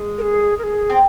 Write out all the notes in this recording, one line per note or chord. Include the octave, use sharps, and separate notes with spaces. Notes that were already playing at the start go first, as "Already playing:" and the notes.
Already playing: G#3
A#4
G#4
A#4
G#4
C4